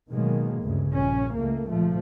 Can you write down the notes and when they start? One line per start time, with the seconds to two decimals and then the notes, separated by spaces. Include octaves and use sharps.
0.10 B2 D#3 F#3 G#3 A#3
0.60 D2 G2 C#3
0.91 A#1 C#4
1.34 C#2 A3 A#3
1.69 A#2 F3 A3